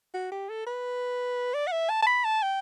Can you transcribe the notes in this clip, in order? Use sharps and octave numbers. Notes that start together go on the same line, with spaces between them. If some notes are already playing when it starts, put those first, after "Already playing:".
F#4
G4
A4
B4
D5
F#5
E5
A5
A5
B5
A5
G5